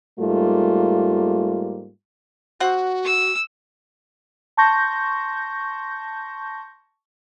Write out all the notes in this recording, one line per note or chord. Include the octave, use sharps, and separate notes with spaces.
G#2 G3 A3 A#3 F4
C4 F#4 F#5
E6
A5 C6 C#6 G6 A#6